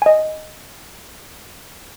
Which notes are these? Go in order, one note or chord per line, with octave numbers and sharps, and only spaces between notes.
D#5 G#5